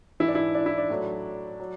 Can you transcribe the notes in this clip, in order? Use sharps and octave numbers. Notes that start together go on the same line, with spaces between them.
G#2 E3 E4
D4
E4
D4
E4
D4
A2 F#3
F#3